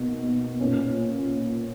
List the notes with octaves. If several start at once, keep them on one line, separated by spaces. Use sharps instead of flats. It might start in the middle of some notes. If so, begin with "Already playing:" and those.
Already playing: B2 A#3 D#4
A#2 A#3 C#4